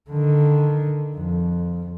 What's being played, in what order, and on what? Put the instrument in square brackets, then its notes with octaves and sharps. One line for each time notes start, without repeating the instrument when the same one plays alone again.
[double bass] D3 D#3
F2